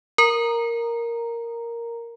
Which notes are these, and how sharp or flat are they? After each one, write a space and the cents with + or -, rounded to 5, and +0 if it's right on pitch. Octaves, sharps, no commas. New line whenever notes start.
A#4 +0 A#5 +0